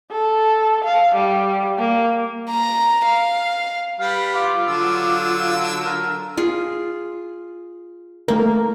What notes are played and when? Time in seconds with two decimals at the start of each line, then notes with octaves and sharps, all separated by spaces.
0.11 A4
0.85 F5
1.16 G3
1.79 A#3
2.50 A#5
3.05 F5
3.99 G3 B4 F5
4.35 F4 D6
4.67 D3 F#3 E6
5.84 A#4
6.37 F4 G#4
8.28 A3 A#3 A#4